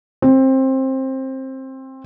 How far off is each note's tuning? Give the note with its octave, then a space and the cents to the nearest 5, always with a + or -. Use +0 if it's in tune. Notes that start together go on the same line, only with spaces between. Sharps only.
C4 +20